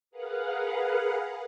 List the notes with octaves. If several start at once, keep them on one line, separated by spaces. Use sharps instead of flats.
G#4 A#4 B4 F5 F#5